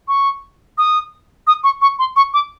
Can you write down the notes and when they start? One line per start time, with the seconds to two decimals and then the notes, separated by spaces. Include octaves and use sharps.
0.08 C#6
0.78 D#6
1.47 D#6
1.64 C#6
1.82 C#6
1.99 C6
2.16 C#6
2.34 D6